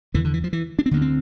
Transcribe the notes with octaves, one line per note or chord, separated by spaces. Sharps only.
E2 D3 E3
D3
E3
F3
E3
D4
C4
D2 D3 A#3
C4